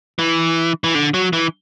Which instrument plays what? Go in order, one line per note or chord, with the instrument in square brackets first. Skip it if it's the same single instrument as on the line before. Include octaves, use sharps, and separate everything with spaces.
[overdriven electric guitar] E3
E3
D3
F#3
E3